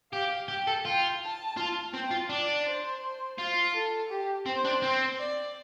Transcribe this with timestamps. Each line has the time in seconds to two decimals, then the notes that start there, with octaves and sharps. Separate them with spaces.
0.12 G4 F5
0.48 G4 G5
0.67 A4
0.85 F4 G5
1.21 A5
1.57 F4
1.93 C4 G5
2.11 F4
2.29 D4 D5
2.66 C5
3.38 F4
3.74 A4
4.10 G4
4.46 C4 C5
4.65 D4
4.82 C4
5.19 D5